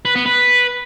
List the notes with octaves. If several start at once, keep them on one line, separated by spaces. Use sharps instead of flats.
B4
B3
B4